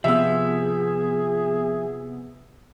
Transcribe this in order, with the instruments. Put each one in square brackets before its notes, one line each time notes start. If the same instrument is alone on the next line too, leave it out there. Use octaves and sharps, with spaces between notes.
[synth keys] C3 B3 [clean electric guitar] F3 [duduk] G#4 [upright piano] E5 E6